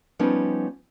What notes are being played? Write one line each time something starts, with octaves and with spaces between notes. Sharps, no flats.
F3 G3 B3 C#4 D#4